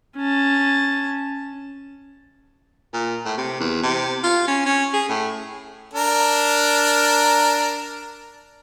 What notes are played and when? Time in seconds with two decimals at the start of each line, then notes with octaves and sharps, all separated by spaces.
0.17 C#4 A5
2.93 A#2
3.25 A2
3.38 C3
3.60 E2
3.82 C3
4.24 F4
4.47 C#4
4.66 C#4
4.93 G#4
5.09 A2
5.93 D4 A#4